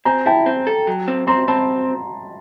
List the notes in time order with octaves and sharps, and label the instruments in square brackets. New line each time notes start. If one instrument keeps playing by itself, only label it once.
[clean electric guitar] C4 [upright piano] G#5 A#5
[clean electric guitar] E4 [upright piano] G5 A5
[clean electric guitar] C4
A4
F#3
C4
[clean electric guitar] C4 [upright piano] A#5 C6
[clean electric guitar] C4 [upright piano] A5 B5